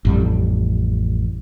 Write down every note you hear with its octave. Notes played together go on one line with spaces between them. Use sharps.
A1 F2 G3